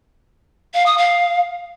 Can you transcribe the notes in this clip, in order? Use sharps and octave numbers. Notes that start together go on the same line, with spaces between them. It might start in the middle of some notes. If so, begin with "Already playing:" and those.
F5
D#6
F5